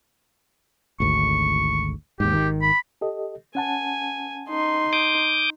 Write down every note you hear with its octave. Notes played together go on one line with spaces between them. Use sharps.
G#1 D2 C#6
D#2 G#2 G4
G#1 D#3
B5
G4 A4 D#5
C#4 F#5 G#5 A5
D#4 C6
D6 D#6 G6